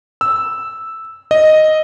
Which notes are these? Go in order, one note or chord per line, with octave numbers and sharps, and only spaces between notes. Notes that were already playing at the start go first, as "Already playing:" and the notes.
E6
D#5